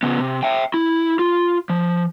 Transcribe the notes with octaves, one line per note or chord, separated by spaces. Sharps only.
C#3 B3
C3
E5 G5
E4
F4
F3